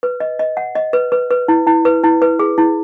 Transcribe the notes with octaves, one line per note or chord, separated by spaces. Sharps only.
B4
D#5
D#5
F#5
D#5
B4
B4
B4
E4
E4
B4
E4
B4
G#4
E4